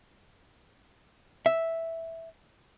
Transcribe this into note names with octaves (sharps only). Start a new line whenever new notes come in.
E5